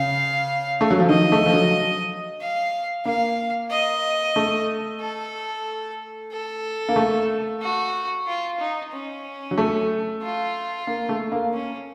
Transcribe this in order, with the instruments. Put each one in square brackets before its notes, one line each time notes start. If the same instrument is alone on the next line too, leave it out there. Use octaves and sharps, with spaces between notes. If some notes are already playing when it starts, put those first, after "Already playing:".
Already playing: [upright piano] C#3 [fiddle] F5
[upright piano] A3
F#3
F3
[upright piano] D#3 [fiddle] D#5
[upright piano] A3
F3
F#3
[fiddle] F5
[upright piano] A#3 [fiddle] F5
[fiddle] D#5
[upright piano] A3
[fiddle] A4
A4
[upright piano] A#3
A3
[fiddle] F#4
F4
D#4
C#4
[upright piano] F#3
A3
[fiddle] F4
[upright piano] A#3
A3
A#3
[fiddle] C#4